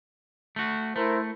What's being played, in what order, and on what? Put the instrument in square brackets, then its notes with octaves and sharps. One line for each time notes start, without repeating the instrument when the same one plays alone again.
[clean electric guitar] A3 F#4
[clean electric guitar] A3 [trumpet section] E4 A#4 C5